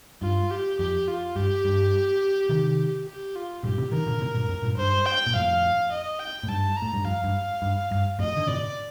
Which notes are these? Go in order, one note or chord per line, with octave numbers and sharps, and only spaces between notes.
G2 F4
G4
F2 G4
F4
G2 G4
G2
C3 D#3
G4
F4
G2 A#2 G4
A2 C3
C3 D#3 A#4
A#2 D3
A2 C3
G2 A#2
F2 A2
G2 A#2
G2 C5
G5
A#2
F2 A2 F5
D#5
G5
A2
G2 A5
A#5
A2
G2
F2 F5
G2
G2
G2
F2 A2 D#5
D3
A2 C3 D5